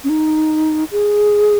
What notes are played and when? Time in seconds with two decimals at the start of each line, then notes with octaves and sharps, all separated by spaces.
0.04 C#4
0.09 D#4
0.92 G#4